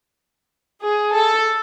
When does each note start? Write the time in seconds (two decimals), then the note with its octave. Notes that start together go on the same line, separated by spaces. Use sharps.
0.84 G#4
1.14 A4